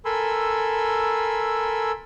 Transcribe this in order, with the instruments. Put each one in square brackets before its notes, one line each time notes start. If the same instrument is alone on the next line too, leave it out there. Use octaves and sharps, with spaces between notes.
[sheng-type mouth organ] A4 A#4 G#5 B5 C6 E6